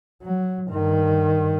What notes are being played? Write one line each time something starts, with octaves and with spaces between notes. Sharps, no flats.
F#3
G2 D#3